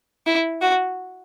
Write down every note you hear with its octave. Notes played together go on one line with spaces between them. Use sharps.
E4
F#4